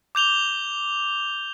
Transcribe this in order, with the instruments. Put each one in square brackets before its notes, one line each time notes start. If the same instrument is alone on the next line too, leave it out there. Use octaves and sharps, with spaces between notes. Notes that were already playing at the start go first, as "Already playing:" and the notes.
[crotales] D6 G6 F7 G7